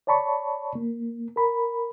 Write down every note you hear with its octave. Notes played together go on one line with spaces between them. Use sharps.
C#5 D5 A5 B5 C#6
A#3
A#4 B5